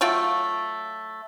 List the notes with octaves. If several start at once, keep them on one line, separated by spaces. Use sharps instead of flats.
F#3 A3 F4 G5